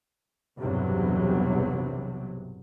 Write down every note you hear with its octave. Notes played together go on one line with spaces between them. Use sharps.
B1 E2 G2 C3 F#3